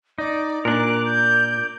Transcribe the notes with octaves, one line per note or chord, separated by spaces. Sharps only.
D#4 D5
A#2 D4 A#4 D5 F#6
G6